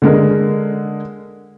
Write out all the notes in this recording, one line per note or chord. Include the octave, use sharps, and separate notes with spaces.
D3 G#3 A#4